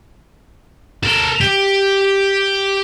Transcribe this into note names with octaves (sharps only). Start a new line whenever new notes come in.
A4 A#4
G4